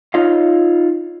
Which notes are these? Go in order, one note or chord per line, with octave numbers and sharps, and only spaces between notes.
D#4 F4 C#5 D#5 F5